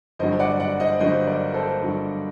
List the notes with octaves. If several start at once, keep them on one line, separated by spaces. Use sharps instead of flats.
G1 G2 F#3 C5 D#5
D5 F#5
D5 F#5
C5 D#5
G1 G2 F#3 C5 D#5
A#4 D5
A4 C5
G1 G2 F#3